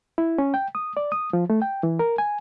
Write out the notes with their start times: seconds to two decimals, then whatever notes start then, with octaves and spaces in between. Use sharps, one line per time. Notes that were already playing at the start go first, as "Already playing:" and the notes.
0.18 E4
0.38 C#4
0.54 G5
0.75 D#6
0.97 D5
1.12 D#6
1.33 F3
1.50 A3
1.62 G5
1.83 E3
1.99 A#4
2.18 G#5